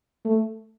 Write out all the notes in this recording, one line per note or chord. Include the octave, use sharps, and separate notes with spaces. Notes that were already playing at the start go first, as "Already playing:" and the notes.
A3